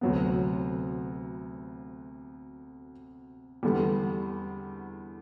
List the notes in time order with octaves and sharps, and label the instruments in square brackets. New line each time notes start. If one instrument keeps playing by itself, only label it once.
[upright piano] D2 C3 F#3 B3
E2 D3 G3 B3